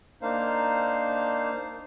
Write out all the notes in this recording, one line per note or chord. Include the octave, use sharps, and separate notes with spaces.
A#3 D4 D#4 C5 F5